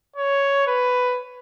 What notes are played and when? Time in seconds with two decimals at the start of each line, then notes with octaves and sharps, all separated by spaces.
0.16 C#5
0.67 B4